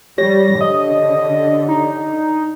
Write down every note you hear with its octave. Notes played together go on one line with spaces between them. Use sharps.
G3 G4 C#5 A#6
D3 D#5
D#4